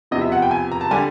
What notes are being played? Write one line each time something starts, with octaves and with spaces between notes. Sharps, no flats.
E2 C3 F3 D#5
E5
F#5
G5
G#5
A#5
A5
D3 G3 G#5